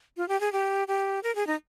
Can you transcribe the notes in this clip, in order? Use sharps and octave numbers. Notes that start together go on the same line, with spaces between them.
F4
G4
G#4
G4
G4
A#4
G#4
D#4